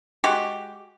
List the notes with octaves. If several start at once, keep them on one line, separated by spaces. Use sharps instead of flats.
G#3 F#4 G4